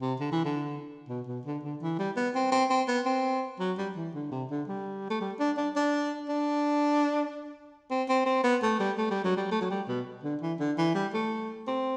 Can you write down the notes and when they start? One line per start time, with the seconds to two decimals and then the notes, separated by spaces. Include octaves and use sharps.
0.02 C3
0.20 D3
0.32 E3
0.45 D3
1.09 B2
1.27 B2
1.45 D3
1.63 D3
1.81 E3
1.99 G3
2.17 B3
2.35 C4
2.52 C4
2.70 C4
2.88 B3
3.06 C4
3.60 F#3
3.78 G3
3.96 E3
4.14 D3
4.32 C3
4.50 D3
4.68 G3
5.10 A3
5.21 G3
5.39 D4
5.57 D4
5.76 D4
6.29 D4
7.91 C4
8.09 C4
8.26 C4
8.44 B3
8.63 A3
8.80 G3
8.98 A3
9.11 G3
9.24 F#3
9.37 G3
9.52 A3
9.61 F#3
9.70 G3
9.88 B2
10.23 D3
10.41 E3
10.59 D3
10.78 E3
10.95 G3
11.14 A3
11.67 C4